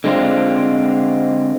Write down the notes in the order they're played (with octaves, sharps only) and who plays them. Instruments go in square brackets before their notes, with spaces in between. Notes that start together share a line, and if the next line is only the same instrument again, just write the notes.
[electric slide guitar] D3 G#3 C4 F4